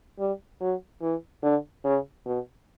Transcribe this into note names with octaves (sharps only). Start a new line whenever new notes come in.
G3
F#3
E3
D3
C#3
B2